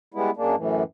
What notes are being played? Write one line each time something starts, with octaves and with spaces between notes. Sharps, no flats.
G3 G#3 B3 E4
F#2 G#3 A#3 D4
F#2 A2 E3